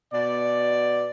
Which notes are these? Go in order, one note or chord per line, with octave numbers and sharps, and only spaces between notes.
B2 D5